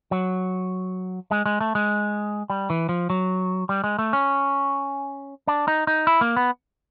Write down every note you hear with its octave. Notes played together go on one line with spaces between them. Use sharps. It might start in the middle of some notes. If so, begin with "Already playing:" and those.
F#3
G#3
G#3
A3
G#3
G3
E3
F3
F#3
G3
G#3
A3
C#4
D4
D#4
D#4
E4
A#3
B3